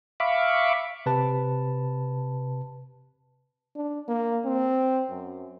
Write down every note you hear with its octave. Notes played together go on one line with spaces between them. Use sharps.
E5 F5 B5 C#6 D6
C3 B4 A5
D4
A#3
C4
F#2